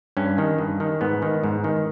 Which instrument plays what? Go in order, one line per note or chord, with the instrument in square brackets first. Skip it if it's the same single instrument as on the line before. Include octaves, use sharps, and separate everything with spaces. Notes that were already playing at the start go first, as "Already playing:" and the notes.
[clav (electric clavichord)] G2 C#4
D#3
G2
D#3
G#2 B3
D#3
G#2
D#3